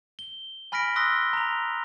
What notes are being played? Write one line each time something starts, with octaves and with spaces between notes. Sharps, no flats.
G7
G#5 B5 F6 A#6 B6 D7
C6 D#6 E6 F#6 A#6 G7
A#5 F7